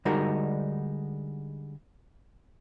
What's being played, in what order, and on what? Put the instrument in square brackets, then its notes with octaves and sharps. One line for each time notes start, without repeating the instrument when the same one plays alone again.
[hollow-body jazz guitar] D3 G3 G#3 D#4 F#4 A#4